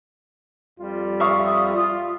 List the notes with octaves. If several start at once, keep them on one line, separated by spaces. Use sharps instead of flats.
F2 G3 F4
E5 F5 C#6 D#6
F4